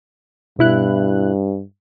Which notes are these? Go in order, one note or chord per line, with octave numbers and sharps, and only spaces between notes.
G2 B2 E4 F#6